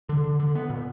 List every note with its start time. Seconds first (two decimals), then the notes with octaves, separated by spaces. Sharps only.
0.09 D3
0.24 D3
0.40 D3
0.55 B3
0.70 A#2